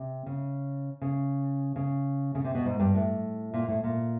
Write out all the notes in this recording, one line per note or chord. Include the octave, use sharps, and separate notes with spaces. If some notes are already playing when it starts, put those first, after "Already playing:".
Already playing: C3
C#3
C#3
C#3
C#3
C3
B2
G#2
G2
A2
A#2
A2
A#2